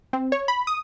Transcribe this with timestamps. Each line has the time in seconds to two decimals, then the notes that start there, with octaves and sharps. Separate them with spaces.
0.13 C4
0.32 C#5
0.48 B5
0.67 D#6